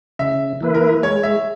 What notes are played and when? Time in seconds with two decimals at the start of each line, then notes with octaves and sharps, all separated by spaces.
0.19 C#3 E5
0.61 E3 A#3 E4 B4
0.74 A#4
1.03 G#3 C#5
1.23 E5